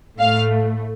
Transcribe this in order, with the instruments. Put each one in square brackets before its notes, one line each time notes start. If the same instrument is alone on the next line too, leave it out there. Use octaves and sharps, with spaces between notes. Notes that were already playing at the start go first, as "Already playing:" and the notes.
[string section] A2 A3 F5